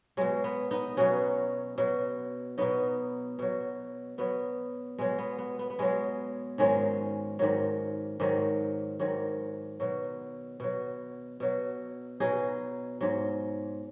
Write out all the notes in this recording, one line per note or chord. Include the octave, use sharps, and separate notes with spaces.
B2 F#3 G#3
B3
B3 D#4
B2 F#3 C#4 F#4
B2 F#3
B2 F#3 B3 D#4
B2 F#3
B2 F#3 B3
B2 F#3 G#3
B3
B3
B3
B3
B2 F#3 G#3
G#2 D#3 F#3 G#3 C#4
G#2 D#3 F#3
G#2 D#3 F#3
G#2 D#3 F#3
B2 F#3
B2 F#3
B2 F#3
B2 F#3 D#4 G#4
G#2 F#3